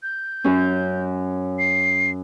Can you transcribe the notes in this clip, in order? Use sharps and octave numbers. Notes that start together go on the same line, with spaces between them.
G6
F#2 C#4
C7